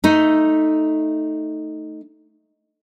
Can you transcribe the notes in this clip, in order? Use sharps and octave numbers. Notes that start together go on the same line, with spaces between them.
A3 D#4